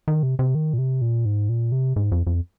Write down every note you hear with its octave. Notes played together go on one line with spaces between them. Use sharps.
D#3
C3
C3
D#3
A#2
C3
A#2
G#2
A#2
C3
G#2
F2
F2